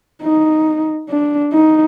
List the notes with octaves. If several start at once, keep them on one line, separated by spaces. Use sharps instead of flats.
D#4
D4
D#4